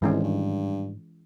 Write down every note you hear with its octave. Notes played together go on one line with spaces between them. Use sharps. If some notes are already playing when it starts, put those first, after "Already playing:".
C2 G#2 D#3 E3 G#3 C#4
G2